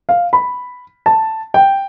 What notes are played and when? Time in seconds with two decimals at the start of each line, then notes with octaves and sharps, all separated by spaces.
0.09 F5
0.33 B5
1.06 A5
1.54 G5